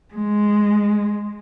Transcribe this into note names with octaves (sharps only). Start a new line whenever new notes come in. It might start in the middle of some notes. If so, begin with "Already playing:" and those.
G#3